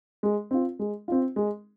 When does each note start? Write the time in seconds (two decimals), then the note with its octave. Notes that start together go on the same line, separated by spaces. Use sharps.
0.23 G#3
0.51 C4 F4
0.79 G#3
1.08 C4 F4
1.36 G#3